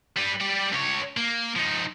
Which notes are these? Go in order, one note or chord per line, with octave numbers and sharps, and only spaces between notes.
G3 B4
G3 D5
C#2 C#5
A#3
F3 D#4